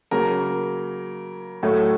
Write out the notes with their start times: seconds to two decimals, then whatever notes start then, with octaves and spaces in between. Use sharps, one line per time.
0.11 C#3 F#3 A#3 A#4
1.63 A2 F#3 A3